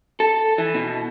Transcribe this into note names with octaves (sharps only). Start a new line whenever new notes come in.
A4
E3
B2